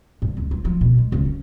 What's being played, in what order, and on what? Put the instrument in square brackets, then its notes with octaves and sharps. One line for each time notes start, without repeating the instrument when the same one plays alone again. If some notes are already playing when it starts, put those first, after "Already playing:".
[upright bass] G2
C#2
F3
F3
B2
G#3
C#2
C#4